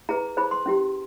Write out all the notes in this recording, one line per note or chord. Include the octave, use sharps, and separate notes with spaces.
E4 G#4 B4 A#5
E4 G#4 C5 B5
C6
C#4 E4 G4